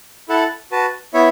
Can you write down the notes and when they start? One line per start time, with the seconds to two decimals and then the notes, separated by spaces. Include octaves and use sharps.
0.29 E4 A4 F#5 A5
0.71 F#4 B4 A5
1.14 B3 E4 C#5 E5